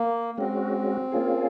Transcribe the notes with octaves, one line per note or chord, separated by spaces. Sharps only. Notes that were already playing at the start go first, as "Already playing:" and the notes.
Already playing: A#3
G#3 C4 C#4 F#4
A#3 C#4 F4 G#4